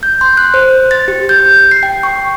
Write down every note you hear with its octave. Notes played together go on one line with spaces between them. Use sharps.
G6
C6
F#6
C5
A6
G4
G6
C7
G5
C#6